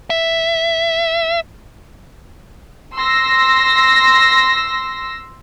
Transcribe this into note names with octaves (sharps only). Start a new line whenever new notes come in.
E5
C6 E6 A#6